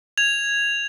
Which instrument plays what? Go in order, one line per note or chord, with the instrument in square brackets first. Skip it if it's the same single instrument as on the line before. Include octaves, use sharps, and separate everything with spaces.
[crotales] G#6 F7